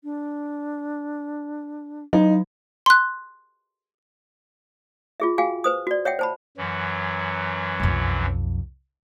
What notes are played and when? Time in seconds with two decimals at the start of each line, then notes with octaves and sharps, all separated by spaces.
0.04 D4
2.13 F#3 D#4
2.86 C6 F#6
5.20 F4 G#4 E5
5.38 F#4 G#4 F5 G5 G#5
5.64 B4 C5 D#6
5.87 F#4 D5
6.05 C#5 E5 F#5 G5
6.19 C5 A5 B5
6.57 F#2 E3 F#3
7.80 B1 F2